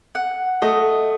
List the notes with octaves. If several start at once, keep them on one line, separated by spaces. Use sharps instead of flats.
F#5
A3 D#5